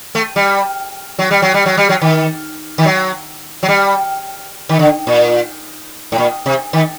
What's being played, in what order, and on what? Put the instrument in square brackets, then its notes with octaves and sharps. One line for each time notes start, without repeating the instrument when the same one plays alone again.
[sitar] A3
G3
F#3
G3
F#3
G3
F#3
G3
F#3
D#3
D#3
F#3
F#3
G3
D#3
D3
A#2
A2
A#2
C3
D#3